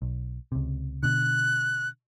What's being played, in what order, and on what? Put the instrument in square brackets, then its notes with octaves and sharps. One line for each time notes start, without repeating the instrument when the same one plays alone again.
[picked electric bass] B1
C#2 C3
[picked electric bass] B2 D3 [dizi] F#6